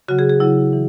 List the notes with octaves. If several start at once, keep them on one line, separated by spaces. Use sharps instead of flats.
C#3 F#3 F#4
G#4
G#4
C#3 F#3 E4
E3